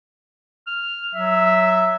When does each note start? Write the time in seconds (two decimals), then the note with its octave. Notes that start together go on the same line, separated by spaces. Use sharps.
0.67 F6
1.15 F#3 E5